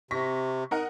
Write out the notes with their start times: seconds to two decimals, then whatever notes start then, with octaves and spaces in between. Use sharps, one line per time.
0.11 C3 C#6 A#6 B6
0.71 D#4 A#4 F#5